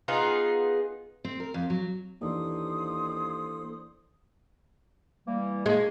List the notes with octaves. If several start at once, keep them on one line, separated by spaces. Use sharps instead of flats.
B3 D#4 F4 G#4
C4
A#4
F2
F#3
D#2 E3 A#3 D4 A4 C5 D#6
E3 G3 A#3
D#3 G#3 A#3 D4